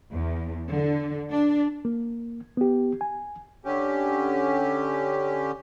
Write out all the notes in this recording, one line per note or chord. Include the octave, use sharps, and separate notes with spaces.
E2
D3
D4
A#3
B3 G4
G#5
D3 C#4 G4